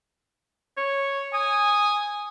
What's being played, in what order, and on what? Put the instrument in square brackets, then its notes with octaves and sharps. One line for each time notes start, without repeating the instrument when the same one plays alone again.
[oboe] C#5
[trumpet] G#5 [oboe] D#6